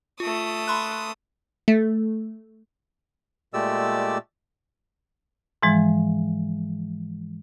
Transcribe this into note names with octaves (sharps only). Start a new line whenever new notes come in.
A3 F4 D#6
B5 C6 F#6
A3
A#2 G#3 A3 G4 D5 E6
G#2 E3 F3 G#3